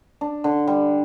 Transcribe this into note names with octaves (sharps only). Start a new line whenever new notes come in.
D4
D3
G3